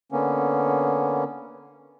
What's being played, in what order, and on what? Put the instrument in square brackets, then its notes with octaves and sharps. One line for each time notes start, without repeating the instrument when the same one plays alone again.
[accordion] D3 A#3 B3 C#4